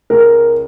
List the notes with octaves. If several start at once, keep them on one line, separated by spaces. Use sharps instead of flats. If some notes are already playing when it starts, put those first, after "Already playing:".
C#2 A#4